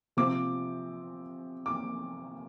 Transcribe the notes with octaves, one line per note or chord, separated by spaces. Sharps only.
C3 F3 C4 D6
D6